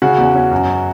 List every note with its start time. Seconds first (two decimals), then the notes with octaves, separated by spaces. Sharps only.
0.02 C#3 F#4
0.18 E2
0.35 C#4
0.51 F#2